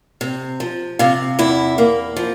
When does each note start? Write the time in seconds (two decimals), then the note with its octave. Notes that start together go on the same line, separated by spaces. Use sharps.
0.21 C3
0.60 F3
0.99 C3 F4
1.39 E2 E4
1.78 A#3
2.17 F3